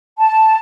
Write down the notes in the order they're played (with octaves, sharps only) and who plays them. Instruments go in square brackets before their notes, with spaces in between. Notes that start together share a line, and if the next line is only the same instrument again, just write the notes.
[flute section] A5